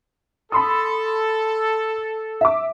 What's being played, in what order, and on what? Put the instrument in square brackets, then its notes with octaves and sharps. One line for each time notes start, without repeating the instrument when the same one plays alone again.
[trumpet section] A4 [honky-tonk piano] B5 C6 D#6
[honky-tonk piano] E5 D6